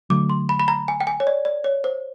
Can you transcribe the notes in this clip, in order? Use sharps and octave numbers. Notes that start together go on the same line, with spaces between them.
D3 F#3 A3 D6
C6
B5
B5
A#5
G#5
G5
G#5
C#5
D5
D5
C#5
C5